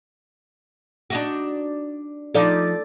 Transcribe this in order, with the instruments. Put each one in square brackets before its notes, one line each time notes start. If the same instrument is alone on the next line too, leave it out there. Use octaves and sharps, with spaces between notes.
[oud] D4 D#4 F#4
[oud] F3 D#4 [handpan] A4 D5